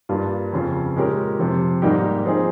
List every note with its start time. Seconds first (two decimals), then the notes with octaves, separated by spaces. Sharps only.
0.09 G2 G3 A#3 F4
0.52 F2 C#3 F3
0.96 A#2 G#3 C#4 G4 A#4
1.39 F2 C3 F3
1.82 G#2 G3 A#3 D#4 G4
2.25 F3 C4 D#4 G#4